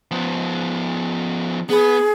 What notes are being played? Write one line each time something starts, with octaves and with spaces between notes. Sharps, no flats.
F3 B3
B3 G#4 B4